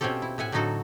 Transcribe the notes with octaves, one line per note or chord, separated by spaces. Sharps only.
B2 C4 C#4 F4 G4 A4
E4
A2 E5 F#5 G#5
A2 D3 F#3 D#4 F#4 A4